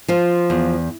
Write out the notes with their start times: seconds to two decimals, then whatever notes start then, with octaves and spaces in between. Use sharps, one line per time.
0.08 F3 F4
0.50 E2